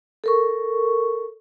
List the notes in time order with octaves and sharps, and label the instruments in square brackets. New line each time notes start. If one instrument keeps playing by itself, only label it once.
[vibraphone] A4 A#4 C#6